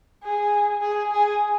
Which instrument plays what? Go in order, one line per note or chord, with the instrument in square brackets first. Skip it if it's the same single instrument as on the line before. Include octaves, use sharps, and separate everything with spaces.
[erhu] G#4
G#4
G#4